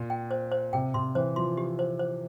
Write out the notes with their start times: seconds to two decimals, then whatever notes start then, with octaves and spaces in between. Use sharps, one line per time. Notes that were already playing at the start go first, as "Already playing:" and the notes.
Already playing: A#2
0.10 G5
0.31 C5
0.51 C5
0.73 C3 G5
0.94 C3 C6
1.15 E3 C5
1.36 F3 C6
1.57 G4
1.79 C5
1.99 C5